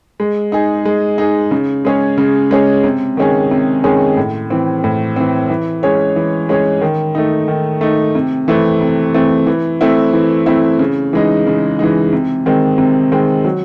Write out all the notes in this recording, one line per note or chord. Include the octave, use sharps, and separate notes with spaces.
G#3
D#4 G#4
G#3
D#4 G#4
C#3
G#3 C#4 G#4 C#5
C#3
G#3 C#4 G#4 C#5
C3
D#3 G#3 C#4 G#4
C3
D#3 G#3 C#4 G#4
A2
E3 C4
A2
E3 C4
E3
G#3 C#4 G#4 C#5
E3
G#3 C#4 G#4 C#5
D#3
A3 D#4
D#3
A3 D#4
C3
E3 A3 C4
C3
E3 A3 C4
E3
A3 C4 E4
E3
A3 C4 E4
C#3
E3 G#3 D#4
C#3
E3 G#3 D#4
C3
D#3 G#3 C4
C3
D#3 G#3 C4
F#3